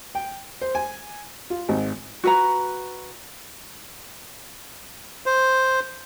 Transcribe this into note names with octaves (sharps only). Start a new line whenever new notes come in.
G5
C5
G#5
F4
G#1
F#4 B4 A#5
C5